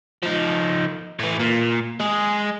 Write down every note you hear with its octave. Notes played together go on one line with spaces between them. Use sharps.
F3 D#4
A2 E3
A#2
G#3 G#4